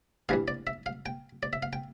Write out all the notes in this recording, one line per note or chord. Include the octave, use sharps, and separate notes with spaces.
G2 E3 G3 F5
D5
E5
F5
G5
D5
E5
F5
G5